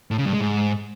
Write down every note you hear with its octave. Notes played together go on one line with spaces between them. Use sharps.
A2
C#3
G2
G#3
G#2